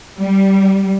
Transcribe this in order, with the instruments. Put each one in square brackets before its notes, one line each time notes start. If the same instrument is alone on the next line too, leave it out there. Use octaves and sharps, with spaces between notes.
[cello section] G3